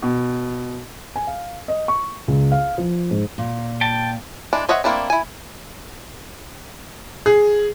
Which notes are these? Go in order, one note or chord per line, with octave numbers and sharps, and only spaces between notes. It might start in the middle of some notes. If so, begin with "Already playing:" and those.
B2
G#5
F5
D#5
C#6
C#2
F5
F3
G#2
A#2
G5 A5
E3 G#3 D4
C5 C#5 D#5 E5 F#5
A3 A#3 C4 D4 E4
E4 G#5
G#4